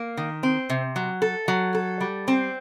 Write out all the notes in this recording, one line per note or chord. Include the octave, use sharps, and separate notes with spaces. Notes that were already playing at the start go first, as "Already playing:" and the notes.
Already playing: A#3
D#3
C4
C3
F#3
A4
F#3
A4
G3
C4